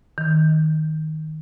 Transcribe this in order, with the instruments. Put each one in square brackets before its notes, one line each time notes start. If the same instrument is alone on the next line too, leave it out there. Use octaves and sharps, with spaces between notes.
[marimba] D#3